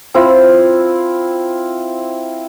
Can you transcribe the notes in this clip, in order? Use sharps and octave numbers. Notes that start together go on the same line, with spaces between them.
C4 E4 F4 E6